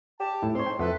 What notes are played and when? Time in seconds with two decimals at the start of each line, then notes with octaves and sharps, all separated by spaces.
0.20 G4 A5
0.42 A2 E4
0.55 G#2 C4 C#5 C6
0.66 G5
0.79 F2 E4 A4 B4 F#5